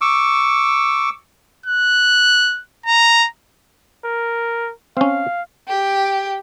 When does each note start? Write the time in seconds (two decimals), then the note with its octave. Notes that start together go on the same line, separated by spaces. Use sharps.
0.01 C#6 D6 E6
1.66 F#6
2.86 A#5
4.05 A#4
4.97 C4 C#4 F5
5.69 G4